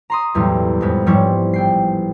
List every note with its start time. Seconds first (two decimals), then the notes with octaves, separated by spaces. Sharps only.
0.10 A#5 C6 D#6
0.34 B1 E2 A2 F#3 G3
0.81 F2 A2 G#3 B3
1.06 G#2 F3 G3 E4 C#5
1.54 A1 G5 C7